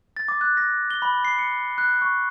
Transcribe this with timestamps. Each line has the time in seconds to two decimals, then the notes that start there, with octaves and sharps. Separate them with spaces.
0.17 A6
0.28 D6
0.41 F#6
0.57 A#6
0.91 G7
1.02 B5
1.25 C7
1.39 C#7
1.78 F#6
2.02 C#6